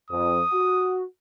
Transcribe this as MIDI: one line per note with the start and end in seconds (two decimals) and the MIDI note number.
0.11 0.41 41
0.11 0.97 87
0.52 1.03 66